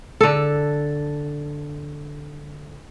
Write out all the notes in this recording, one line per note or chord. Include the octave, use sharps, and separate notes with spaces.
D3 A4